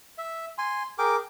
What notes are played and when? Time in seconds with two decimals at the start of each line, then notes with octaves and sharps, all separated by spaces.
0.18 E5
0.58 G#5 C6
0.98 G#4 A#4 G5 D6